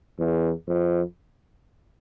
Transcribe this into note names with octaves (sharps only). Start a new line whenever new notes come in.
E2
F2